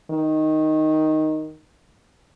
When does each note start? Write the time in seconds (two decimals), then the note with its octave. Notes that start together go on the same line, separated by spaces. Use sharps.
0.11 D#3